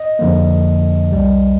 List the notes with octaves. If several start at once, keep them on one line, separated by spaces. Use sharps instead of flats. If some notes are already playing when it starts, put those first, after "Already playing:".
Already playing: D#5
F2 D3 F3 A#3
C2 C3 G3